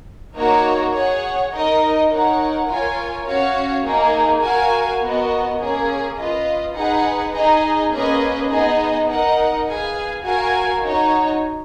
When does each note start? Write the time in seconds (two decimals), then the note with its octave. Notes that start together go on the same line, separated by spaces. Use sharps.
0.35 A#3 D#4 F#4 A#4 C#5
0.94 G#4 C#5 F#5
1.52 D#4 A#4 D#5
2.09 D#4 A#4 C#5 F#5
2.68 F4 A#4 C#5 G#5
3.26 C#4 F#4 C#5 F5
3.83 A#3 D#4 G#4
4.42 F#4 A#4 F5 G#5
5.00 B3 F#4 A#4 D#5
5.59 A#3 C#4 G#4
6.17 F4 B4 D#5
6.74 D#4 G#4 B4 F#5
7.33 D#4 G#4 D#5
7.91 A#3 C#4 G#4 B4 D#5
8.49 B3 D#4 G#4 D#5
9.07 D#4 A#4 D#5 F#5
9.66 G#4 B4 F5 G#5
10.23 F#4 A#4 F5 G#5
10.82 D#4 F#4 C#5